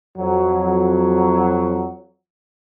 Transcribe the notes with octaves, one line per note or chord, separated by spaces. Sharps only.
F2 F#3